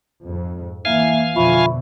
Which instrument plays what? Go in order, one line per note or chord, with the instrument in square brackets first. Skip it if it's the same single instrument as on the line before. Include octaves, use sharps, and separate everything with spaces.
[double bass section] F2 G#2
[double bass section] E3 [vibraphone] A#3 E5 [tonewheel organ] F5 G#5
[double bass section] F2 B2 D3 [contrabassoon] F3 [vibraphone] E5 B5 C#6